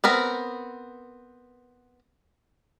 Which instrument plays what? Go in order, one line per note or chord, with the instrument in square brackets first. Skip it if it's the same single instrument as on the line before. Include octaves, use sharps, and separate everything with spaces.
[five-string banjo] B3 C4 A#4 B4